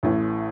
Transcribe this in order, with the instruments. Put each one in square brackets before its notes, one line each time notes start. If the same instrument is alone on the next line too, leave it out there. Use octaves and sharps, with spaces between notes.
[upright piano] A1 A2 E3